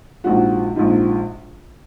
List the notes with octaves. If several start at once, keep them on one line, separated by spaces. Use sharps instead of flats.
A#1 G#2 F3 F#4
A#1 G#2 F3